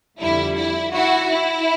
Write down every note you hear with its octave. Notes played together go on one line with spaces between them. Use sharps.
F2 D3 G3 E4
E4
E4 F#4
E4